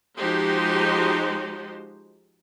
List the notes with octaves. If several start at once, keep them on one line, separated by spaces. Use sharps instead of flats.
F3 G#3 D#4 F#4 G4 C5